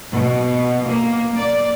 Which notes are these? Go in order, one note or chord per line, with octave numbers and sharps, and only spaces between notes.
B2
A#3
D5